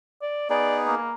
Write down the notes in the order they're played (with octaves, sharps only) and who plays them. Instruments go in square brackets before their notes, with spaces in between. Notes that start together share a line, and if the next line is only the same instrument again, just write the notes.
[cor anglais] D5
[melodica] B3 D#4 G#4 [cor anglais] D5
[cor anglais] A#3